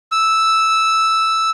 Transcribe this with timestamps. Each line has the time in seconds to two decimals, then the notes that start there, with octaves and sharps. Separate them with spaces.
0.12 E6